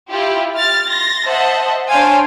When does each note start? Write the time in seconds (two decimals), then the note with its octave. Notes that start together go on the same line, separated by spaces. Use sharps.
0.11 E4 F4 G4
0.54 F6 A6
0.89 C6 A6 A#6
1.27 C5 D#5 E5 F#5 A5
1.88 D4 C5 C#5 F5 G5 G#5